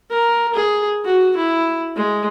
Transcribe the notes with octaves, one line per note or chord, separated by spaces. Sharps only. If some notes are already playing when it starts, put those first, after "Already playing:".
A#4
G#4
F#4
E4
G#3